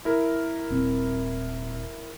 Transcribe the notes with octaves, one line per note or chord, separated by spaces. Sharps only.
E4 A#4
D#1 C4